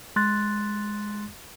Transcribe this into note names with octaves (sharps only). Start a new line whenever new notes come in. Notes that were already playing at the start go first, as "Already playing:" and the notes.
G#3 C6 F#6 A6